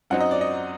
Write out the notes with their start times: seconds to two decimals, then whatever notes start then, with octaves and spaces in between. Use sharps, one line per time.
0.10 F#2 F#3 C4 D#4 F#5
0.20 D#5
0.31 D5
0.41 D#5